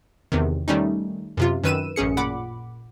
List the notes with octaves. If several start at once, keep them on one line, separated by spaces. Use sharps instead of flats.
E2 C3 D#3
D#3 G3 A3 C#4 D#4
F#2 C3 F4
F#2 D#3 B4 E6 D#7 E7
A1 F#2 C#4 G#4 C#7
A#2 F#5 B5 D6